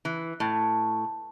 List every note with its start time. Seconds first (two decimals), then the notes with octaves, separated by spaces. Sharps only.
0.05 E3
0.40 A2